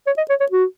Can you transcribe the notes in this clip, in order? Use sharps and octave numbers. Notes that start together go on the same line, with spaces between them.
C#5
D#5
C#5
C#5
F#4